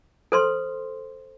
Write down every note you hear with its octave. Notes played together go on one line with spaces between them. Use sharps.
A4 C5 C6